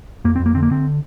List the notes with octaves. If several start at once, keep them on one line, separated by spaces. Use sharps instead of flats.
F2 A#3
C4
F2
A#3
D3 C4
A#3
D3 C4